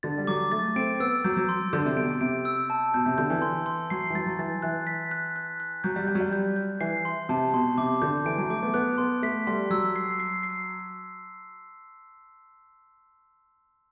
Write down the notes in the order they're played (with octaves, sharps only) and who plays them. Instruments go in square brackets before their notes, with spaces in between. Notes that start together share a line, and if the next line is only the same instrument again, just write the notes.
[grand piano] D3 [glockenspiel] A6
[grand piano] G3
[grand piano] F#3 [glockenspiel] D6
[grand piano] A3 [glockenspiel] A6
[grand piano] C4 [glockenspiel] D7
[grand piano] B3 [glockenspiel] E6
[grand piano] F#3 [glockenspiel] G6
[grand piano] F#3
[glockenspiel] C6
[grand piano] D3 [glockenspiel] G6
[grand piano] C3
[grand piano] B2 [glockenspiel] D7
[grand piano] C3 [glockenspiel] D7
[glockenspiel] E6
A5
[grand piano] B2 [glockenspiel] G6
[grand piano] C3
[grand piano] D3 [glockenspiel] G6
[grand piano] E3
[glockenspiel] C6
C6
[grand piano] F#3 [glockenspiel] C7
[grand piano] E3
[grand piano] F#3 [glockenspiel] A6
[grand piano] F#3
[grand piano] E3 [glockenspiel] A6
[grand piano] E3 [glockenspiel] F#6
[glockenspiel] B6
F#6
F#6
F#6
[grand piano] F#3 [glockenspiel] G6
[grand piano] G3
[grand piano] G3 [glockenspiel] G6
[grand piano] F#3
G3
[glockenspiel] G6
G6
[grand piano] E3 [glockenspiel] C7
[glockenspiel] C6
[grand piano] C3 [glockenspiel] A5
[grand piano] B2 [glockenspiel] C6
[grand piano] C3 [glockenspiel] D6
[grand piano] D3 [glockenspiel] G6
[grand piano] E3 [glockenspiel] D7
[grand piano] F#3
[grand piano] A3 [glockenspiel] D6
[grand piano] B3
[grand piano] B3 [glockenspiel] F#6
[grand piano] B3 [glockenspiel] C6
[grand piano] A3 [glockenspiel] B6
[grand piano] G3 [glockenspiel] C6
[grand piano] F#3 [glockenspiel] E6
[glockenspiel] C7
C7
C7